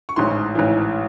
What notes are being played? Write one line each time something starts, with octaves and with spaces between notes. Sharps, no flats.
C#6
A1 G#2 E3 C6
A1 G#2 E3